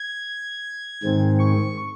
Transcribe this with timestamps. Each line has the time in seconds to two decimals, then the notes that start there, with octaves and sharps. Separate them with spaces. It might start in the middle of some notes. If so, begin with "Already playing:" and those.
Already playing: G#6
1.03 G#2 D#3 G#3 C4
1.39 C#6